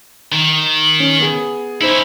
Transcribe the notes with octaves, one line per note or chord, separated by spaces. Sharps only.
D#3
C#4
B3 G#4
C#4 D#4 E4 C5